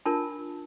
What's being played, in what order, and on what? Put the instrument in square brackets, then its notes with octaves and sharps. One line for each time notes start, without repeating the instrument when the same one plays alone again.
[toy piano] D4 F4 A#4 A5